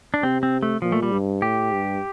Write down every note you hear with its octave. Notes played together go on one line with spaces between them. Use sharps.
D4
C3 C4
C4
A3
A#2 F3
A3
G3
G2
A2 G4
G2